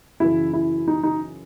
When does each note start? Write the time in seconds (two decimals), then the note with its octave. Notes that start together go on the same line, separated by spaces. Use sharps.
0.20 F#2 C#3 E3 E4
0.53 E4
0.88 D#4
1.03 D#4